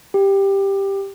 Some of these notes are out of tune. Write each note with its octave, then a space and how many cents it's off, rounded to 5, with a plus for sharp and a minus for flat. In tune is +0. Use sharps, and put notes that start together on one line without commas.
G4 +5